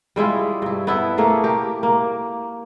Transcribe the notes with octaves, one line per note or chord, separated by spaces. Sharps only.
G3 G#3 E4 F4
G2 E4
B3 E4 A4 E5
A3 A#3 G#4
G4 A#4
A#3